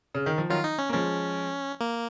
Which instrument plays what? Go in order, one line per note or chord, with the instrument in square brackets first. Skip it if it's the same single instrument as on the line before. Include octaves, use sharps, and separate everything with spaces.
[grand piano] C#3
D#3
F3
[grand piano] D#3 F#3 [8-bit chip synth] F4
[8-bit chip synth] D#4
C#4
[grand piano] A#3
[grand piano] F3 G#3 [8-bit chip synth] C#4
[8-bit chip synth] A#3